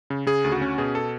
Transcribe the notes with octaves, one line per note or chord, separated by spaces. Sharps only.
C#3
C#3 G#4
D2
F#4
C#4
B2 G#4
A4